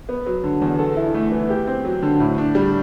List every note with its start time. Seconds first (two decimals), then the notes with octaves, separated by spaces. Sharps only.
0.09 B3
0.26 F#3
0.44 D3
0.62 E2
0.79 A4
0.97 E4
1.14 A3
1.32 E3
1.50 G4
1.67 C4
1.85 F#3
2.03 D3
2.20 A2
2.38 D4
2.55 G3